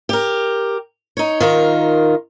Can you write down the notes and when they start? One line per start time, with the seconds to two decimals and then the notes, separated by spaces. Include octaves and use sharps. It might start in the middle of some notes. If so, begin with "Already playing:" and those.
0.09 G4 A#4
1.17 D#4 C#5
1.40 D#3 F4 A#4